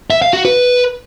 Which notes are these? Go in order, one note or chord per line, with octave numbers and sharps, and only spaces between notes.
E5
F5
F#4
B4